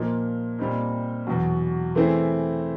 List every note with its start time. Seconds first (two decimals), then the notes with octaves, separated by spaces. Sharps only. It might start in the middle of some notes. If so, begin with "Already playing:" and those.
Already playing: A#2 F3 A#3 D#4
0.59 A#2 G3 C4 D#4
1.27 E2 B2 F#3
1.95 E3 A3 C4 E4 G#4